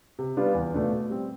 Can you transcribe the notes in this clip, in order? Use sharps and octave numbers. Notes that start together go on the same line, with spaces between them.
C3
G3 B3 D4 F4
E2
B2 A3 D4 F4
B2
G3 C4